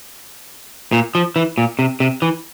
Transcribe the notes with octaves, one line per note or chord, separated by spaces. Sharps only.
A#2
F3
E3
A#2
C3
C3
E3